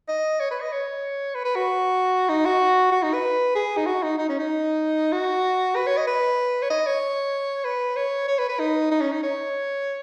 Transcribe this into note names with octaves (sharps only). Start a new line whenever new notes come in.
D#5
C#5
B4
D#5
C#5
B4
B4
F#4
D#4
F#4
F#4
D#4
B4
G#4
D#4
F#4
D#4
D#4
C#4
D#4
F#4
B4
C#5
D#5
B4
C#5
D#5
C#5
B4
C#5
C#5
B4
B4
D#4
D#4
C#4
D#4
C#5